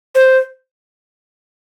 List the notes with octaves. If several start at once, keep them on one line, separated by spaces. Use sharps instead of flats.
C5